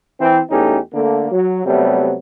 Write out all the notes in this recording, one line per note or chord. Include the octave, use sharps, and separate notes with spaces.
E3 C4
E2 A3 C#4 D#4 G4
D3 A3 A#3
F#3
C3 F#3 G3 A3 B3